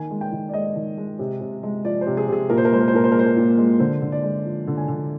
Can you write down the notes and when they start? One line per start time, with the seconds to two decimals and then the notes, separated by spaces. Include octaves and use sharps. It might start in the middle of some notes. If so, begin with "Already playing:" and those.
Already playing: D#3 A#3 G#5
0.11 G#3
0.21 G5
0.32 D#3
0.49 D5
0.54 G#3 D#5
0.76 D#3
0.97 G#3
1.19 C3
1.41 C3
1.63 G#3
1.84 F3 D5
2.01 C5
2.07 C3
2.17 G#4
2.28 C3 G#4
2.49 A#2 A#4
2.57 C5
2.65 A#4
2.72 G#3 C5
2.80 A#4
2.88 C5
2.93 A#2 A#4
3.04 C5
3.12 A#4
3.15 G#3 C5
3.26 A#4
3.37 A#2
3.58 G#3
3.79 D3 C5
4.02 D3
4.12 D5
4.23 G#3
4.45 F3
4.67 D3
4.77 G#5
4.88 D3